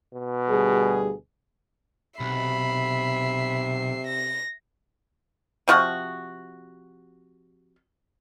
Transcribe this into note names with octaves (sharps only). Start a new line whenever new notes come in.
B2
D2 G3 G#4
B1 C3 E5 B5 C7
A#6
C3 F3 F#4